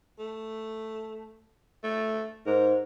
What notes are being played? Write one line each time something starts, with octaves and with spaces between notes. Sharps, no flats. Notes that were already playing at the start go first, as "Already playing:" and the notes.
A3
A3
G#2 A#4